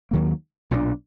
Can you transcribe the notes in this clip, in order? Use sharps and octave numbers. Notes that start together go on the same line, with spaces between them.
D#2 D#3 F#3 A#3
B1 A#2 F#3 D4